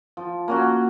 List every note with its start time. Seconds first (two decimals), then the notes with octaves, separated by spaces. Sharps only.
0.17 F3
0.48 A#3 C#4 F#4